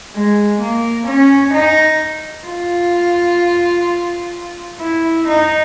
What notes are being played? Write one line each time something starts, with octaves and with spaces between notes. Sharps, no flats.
G#3
A#3
C#4
D#4
F4
E4
D#4